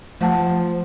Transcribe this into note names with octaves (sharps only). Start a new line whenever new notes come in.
F3 A3 F#5 A5